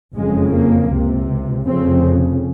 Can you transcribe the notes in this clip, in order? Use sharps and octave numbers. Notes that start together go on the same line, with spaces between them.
F#1 F2 C#3 G#3
A#3
C#2 C3
F1 F2 C#3 C4